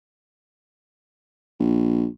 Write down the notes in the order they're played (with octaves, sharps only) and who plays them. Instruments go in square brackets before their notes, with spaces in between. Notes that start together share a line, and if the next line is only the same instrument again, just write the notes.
[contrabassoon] A#1